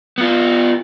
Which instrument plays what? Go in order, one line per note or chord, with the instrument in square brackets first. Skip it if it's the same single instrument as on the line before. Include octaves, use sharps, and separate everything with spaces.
[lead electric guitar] B3 F4